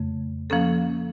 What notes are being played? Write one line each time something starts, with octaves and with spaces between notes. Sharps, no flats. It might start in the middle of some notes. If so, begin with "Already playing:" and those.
Already playing: F2 C#3 A3
F3 A#3 C#4 A4